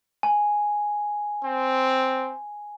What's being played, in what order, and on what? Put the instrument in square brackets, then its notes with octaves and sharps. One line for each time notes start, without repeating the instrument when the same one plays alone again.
[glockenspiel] G#5
[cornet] C4